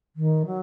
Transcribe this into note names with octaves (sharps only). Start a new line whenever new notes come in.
D#3
F#3